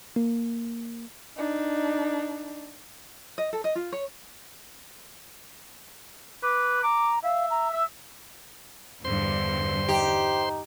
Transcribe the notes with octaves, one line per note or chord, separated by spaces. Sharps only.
A#3
D4 D#4
D#5
A4
D#5
F4
C#5
B4 D6
A#5 D6
E5 F5
A#5
E5 E6
E2 G2 D3 C5 C6
D#4 G4